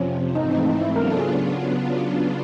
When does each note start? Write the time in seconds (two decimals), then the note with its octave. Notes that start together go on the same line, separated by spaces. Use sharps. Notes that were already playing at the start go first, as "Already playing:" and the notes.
Already playing: F2 C3 F3 C#4
0.35 G#2 E3 A3 C4 D#4
0.51 D#4
0.65 D#4
0.81 E4
0.95 C#3 F#3 B3 D4 F4 A#4
1.11 A4
1.19 G#4